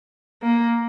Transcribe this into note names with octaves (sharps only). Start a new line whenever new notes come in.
A#3